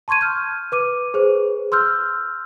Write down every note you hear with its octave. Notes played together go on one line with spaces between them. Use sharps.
A5 C6 C#6 G#6 D#7
F6 G6
B4 D6 D#7
G#4 B4 C5
C6 E6 F6 G6